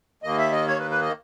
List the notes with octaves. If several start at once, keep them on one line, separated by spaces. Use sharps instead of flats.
D#2 D#3 A#3 D#5
E5
D#5
C#5
B4
B4
D#5